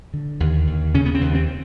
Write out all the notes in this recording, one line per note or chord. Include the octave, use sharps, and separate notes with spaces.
D3
D#2
D#2
C#3 C#4
B3
C4
D#2
C4